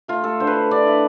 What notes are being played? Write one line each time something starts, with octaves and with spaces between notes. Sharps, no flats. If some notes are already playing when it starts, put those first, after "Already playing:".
A3 F4
A3 A4
D3 C5
B4
E4
D3 D5
E4